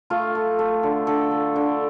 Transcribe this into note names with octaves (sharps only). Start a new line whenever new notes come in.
A3 F4
A3
A3
D3
D3 A4
A3
D3